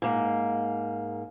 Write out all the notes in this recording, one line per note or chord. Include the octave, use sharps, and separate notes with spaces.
G#2 A#3